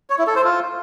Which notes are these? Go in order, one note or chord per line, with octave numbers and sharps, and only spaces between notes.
C#5
E4
A4
C5
F4